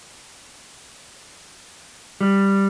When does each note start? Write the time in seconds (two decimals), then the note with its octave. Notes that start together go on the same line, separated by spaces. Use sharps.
2.21 G3